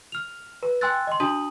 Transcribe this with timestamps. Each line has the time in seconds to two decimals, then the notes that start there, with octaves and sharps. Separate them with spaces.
0.12 F6 F7
0.63 B4
0.81 G5 G#5 C6 E6 F#6 A6
1.07 D#5 C6
1.20 D4 F#4 A5 D#6 D#7 F#7